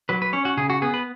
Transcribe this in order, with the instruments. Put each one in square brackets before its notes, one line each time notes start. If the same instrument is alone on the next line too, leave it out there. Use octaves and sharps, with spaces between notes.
[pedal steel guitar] F#3 B4
B4
C#4 C#5
F#4
C#3 G#4
F#4
B3 G#4
B4